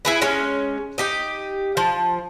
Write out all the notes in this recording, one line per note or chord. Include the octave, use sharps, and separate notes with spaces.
E4 G#4 B4
G#3 C#4
D#4 G4 D#5
F3